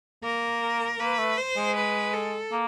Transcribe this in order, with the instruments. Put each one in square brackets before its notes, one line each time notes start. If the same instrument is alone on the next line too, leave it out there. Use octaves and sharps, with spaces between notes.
[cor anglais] A#3 [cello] A#4
[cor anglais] A#3 [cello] B4
[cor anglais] A3
[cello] C5
[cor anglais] G#3
[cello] B4
A4
[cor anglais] A#3